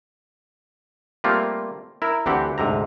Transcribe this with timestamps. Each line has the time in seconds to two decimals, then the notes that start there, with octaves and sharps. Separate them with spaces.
1.24 G3 A3 A#3 C4 F4
2.02 E4 A#4
2.26 D2 E3 C4 G4 F#5
2.58 D2 G#2 C3 A#5